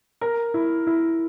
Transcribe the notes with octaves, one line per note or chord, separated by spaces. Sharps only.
A#4
E4
E4